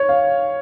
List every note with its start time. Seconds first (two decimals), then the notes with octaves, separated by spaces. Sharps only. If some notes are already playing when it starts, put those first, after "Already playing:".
Already playing: C#5
0.09 F5